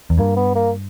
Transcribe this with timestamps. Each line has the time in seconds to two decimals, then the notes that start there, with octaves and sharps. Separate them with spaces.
0.10 E2
0.18 G2 A#3
0.36 B3
0.55 A#3